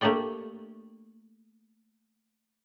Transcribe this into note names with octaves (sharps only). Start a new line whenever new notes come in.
A3 A#3 D4 G4 D5 G5